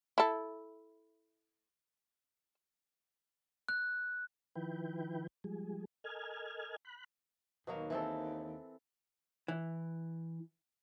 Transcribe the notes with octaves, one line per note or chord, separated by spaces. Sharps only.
E4 A4
F#6
D#3 F3 E4 B4 G5
F3 G3 G#3 G#4
A4 A#4 D#5 G#5 F6 G#6
B5 F#6
D#2 B2 F#3 A#3
E3 C4 A4
E3